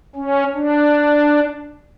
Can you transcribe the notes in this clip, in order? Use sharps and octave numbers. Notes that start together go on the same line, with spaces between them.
C#4
D4